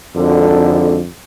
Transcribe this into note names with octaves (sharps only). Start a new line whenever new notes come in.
G#1 F2 D3